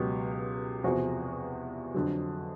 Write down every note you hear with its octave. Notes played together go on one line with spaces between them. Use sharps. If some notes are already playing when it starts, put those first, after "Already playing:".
Already playing: C#2 B2 F#3 G4
E2 C3 F3 F#4 G#4
F2 D3 F#3